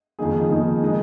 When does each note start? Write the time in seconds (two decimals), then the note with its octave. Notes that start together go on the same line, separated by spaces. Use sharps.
0.19 F2 D#3 A#3 D#4 G#4
0.50 F2 D#3 A#3 D#4 G#4
0.82 D#3 G#3 D#4